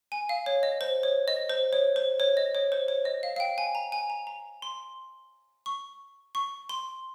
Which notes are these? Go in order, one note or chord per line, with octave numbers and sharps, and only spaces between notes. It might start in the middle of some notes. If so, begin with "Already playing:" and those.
G#5
F5
C#5
D#5
C5
C#5
D#5
C5
C#5
C5
C#5
D#5
C#5
C5
C#5
D#5
F5
F5
G5
G#5
A#5
G#5
A#5
A#5
C6
C#6
C#6
C6